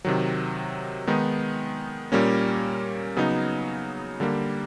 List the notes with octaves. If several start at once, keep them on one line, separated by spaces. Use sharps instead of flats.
C3 D#3 F#3
D#3 G#3 B3 D#4
A#2 G3 A#3 C#4
C#3 F#3 B3 D#4
D3 G3 A#3